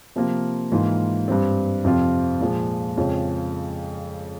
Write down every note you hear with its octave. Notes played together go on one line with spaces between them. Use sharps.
C3 F3 A#3 F4
G#2 E3 A#3 F4
G2 G3 C4
F2 C3 F3 C4 F4
A#2 F3 G#3
F2 C#3 F3 G#3 C#4